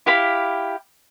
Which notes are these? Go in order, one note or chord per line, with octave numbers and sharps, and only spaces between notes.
E4 G4 F5 B5